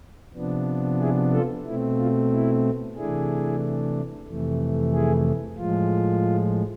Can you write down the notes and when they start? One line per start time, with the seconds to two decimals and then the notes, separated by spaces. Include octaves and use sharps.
0.34 C3 F3 B3 D4
0.99 E4 G#4
1.32 F4 A4
1.65 B2 A3 C4 E4
1.97 F4
2.30 E4
2.96 C3 E3 A3 D4 E4 G#4
4.27 F2 C3 E3 A3
4.93 E4 G#4
5.58 A2 F3 G#3 F4